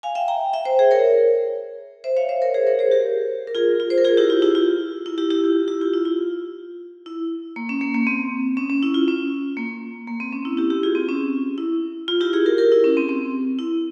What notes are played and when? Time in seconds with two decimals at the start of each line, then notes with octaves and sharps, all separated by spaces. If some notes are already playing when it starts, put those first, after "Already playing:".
0.03 F5 G#5
0.15 E5 G5
0.28 G5 A#5
0.53 E5 G5
0.65 C5 E5
0.79 G#4 C5
0.91 A#4 C#5
2.04 C5 E5
2.16 C#5 F5
2.29 C5 E5
2.42 A#4 C#5
2.54 G#4 C5
2.67 A#4 C#5
2.79 G#4 C5
2.91 G4 A#4
3.47 A#4
3.55 F4 G#4
3.80 F4
3.90 C5
3.98 A#4
4.04 F4 G#4
4.17 E4 G4
4.30 F4
4.42 E4 G4
4.55 F4
5.06 E4
5.18 E4 G4
5.31 E4 G4
5.43 F4
5.68 E4 G4
5.81 F4
5.94 E4
6.05 F4
7.06 E4
7.56 A#3
7.69 C#4
7.81 A#3
7.94 A#3
8.07 C4
8.57 C#4
8.70 C#4
8.83 E4
8.94 F4
9.08 C#4
9.57 A#3
10.07 A#3
10.20 C4
10.33 C#4
10.45 E4
10.57 E4 G4
10.70 E4 G4
10.83 F4 G#4
10.95 C4
11.09 C#4
11.58 E4
12.08 F4
12.21 E4 G4
12.33 F4 G#4
12.46 G4 A#4
12.58 G4 A#4
12.72 E4
12.84 C#4
12.97 C4
13.09 C4
13.59 E4